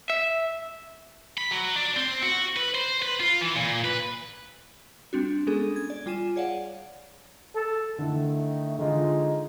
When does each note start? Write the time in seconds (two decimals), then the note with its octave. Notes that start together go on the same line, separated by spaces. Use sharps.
0.10 E5
1.38 B5
1.51 F#3
1.76 D4
1.97 C4
2.23 F#4
2.56 B4
2.75 C5
3.02 B4
3.20 F4
3.41 E3
3.56 A#2
3.85 B4
5.13 G3 C4 D4 F#4
5.47 G#3 B3 C#4 D4 G#4 A4
5.76 G#6
5.90 D5
6.06 G3 F4 G#5 D#7 E7
6.36 G#4 C#5 D5 F5 F#5
7.56 A4
7.98 D3 D#3 A3 E4
8.79 D3 G#3 D#4 F4